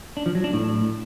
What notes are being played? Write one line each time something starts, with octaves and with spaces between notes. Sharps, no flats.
D4
F3
F#3
D4
A2